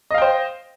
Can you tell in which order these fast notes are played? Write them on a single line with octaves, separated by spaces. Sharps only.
D#5 F5 G5 C5